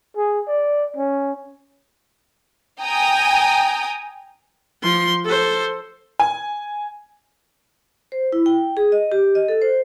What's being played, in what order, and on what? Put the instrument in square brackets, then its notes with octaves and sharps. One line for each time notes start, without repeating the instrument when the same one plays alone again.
[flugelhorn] G#4
D5
C#4
[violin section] G5 G#5 A#5 D#6
[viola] F3 C6
A4 C5
[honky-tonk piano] G#5
[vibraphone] C5
E4
G5
G#4
D#5
G4
D#5
A4
C5